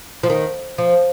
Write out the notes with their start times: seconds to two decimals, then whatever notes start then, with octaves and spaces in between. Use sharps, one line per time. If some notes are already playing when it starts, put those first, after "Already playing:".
0.23 F3
0.30 D#3
0.78 F3